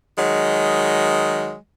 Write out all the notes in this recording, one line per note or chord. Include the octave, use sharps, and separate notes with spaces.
D#3 F#3 G#3